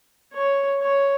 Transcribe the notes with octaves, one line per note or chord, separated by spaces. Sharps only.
C#5
C#5